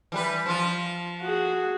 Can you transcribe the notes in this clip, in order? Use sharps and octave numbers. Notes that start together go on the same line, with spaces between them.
E3 G3 B4
F3 F4
F#4 G#4